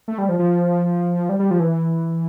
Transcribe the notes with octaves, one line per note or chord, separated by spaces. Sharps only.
A3
G3
F3
F3
G3
G3
F3
E3